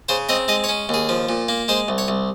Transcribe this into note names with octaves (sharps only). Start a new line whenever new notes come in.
C#3 C5
C4 D#5
G#3 D#5
C#5
C#4
D#2 G#4
F3
A#2
A#3
G#3 C5
C2
C#5
C2